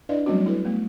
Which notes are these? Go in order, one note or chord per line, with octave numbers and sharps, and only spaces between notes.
D4 E4 B4 D5 D#5 F5
F#3 G3 A3 C4 C#4 F#4
E4 A4 B4
A3 B3